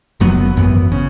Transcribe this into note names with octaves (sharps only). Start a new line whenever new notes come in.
F#1 F#2 F#3 B3
G#1 F#2 E3 B3
C#3